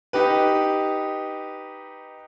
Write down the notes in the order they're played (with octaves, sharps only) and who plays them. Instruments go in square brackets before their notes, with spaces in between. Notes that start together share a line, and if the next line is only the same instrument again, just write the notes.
[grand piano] D#4 G4 B4